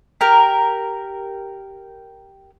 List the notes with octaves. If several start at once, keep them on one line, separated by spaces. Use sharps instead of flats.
G4 A#4